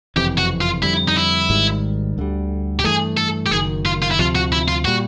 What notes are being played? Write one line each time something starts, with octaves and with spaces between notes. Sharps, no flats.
F#1 F2 C3 E3 G4
F#4
F4
F2 D3 G3 E4
D#4
E4
G#1 G#2 D#3 G3
D2 D3 G3
G4
G2 E3 A3 G#4
A4
G4
F#1 F#2 D#3 G#4
F4
F4
E4
D2 C3 F3 F4
F#4
E4
F4
A#2 G3 F#4